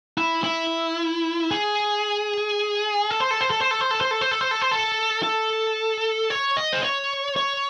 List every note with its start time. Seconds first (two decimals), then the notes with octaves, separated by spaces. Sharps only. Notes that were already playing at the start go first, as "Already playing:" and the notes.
0.18 E4
0.44 E4
1.51 G#4
3.10 A4
3.20 C5
3.31 A4
3.41 C5
3.51 A4
3.60 C5
3.71 A4
3.81 C5
3.91 A4
4.01 C5
4.11 A4
4.21 C5
4.31 A4
4.41 C5
4.51 A4
4.62 C5
4.71 A4
5.23 A4
6.30 C#5
6.57 D#5
6.73 C5
6.83 C#5
7.36 C#5